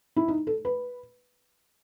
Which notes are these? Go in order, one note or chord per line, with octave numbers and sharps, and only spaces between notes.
E4
D#4
A4
B4